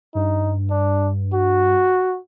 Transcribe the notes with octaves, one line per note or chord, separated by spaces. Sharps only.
G2 D#4
D4
F#4